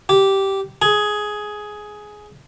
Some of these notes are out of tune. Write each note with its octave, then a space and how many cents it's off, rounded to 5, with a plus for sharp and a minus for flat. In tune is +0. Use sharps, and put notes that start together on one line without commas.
G4 -10
G#4 +10